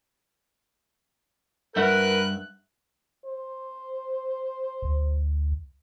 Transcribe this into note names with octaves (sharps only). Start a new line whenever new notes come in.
G2 A#4 B4 E5 F#5 F#6
C5
D2